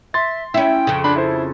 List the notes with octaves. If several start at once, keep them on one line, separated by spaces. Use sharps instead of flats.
E5 C6 A6
C#4 E4 G5
F2 C#3
D4 B5
E4 A4 C5